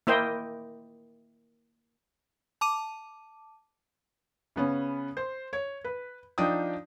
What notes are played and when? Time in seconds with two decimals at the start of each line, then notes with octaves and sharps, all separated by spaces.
0.07 A#3 E4 C5 D#5 G5
2.61 A5 D6 D#7
4.56 C#3 B3 C#4
5.17 C5
5.53 C#5
5.84 B4
6.38 F3 D4 D#4 G5 D#6